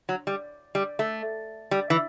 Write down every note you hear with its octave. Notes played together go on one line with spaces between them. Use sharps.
F#3
G3
G3
A3
G3
E3